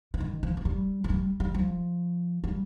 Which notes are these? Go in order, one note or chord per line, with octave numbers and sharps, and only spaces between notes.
F3
D#3
F3
F3
G3
F3
G3
G3
F3
G3